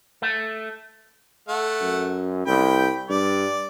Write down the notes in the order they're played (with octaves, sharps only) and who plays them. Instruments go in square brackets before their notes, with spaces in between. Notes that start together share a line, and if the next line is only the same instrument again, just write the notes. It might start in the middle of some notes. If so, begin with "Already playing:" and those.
[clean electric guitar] A3
[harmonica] A3 F#5
[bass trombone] F#2
[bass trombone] C2 [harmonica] G5 B5
[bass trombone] G2 [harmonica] D5